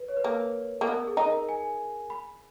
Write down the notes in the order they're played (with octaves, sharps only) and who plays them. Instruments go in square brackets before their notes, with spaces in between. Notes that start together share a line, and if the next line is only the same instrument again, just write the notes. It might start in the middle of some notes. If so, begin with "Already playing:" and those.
Already playing: [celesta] B4
C#5
B4
[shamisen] A#3 [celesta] A#4
[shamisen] A#3
[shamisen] B3 [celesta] A#4
[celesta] G#4
[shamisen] D#4
[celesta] A#4
G#5
B5